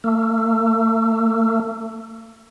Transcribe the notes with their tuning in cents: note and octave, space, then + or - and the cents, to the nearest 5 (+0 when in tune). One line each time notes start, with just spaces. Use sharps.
A3 +40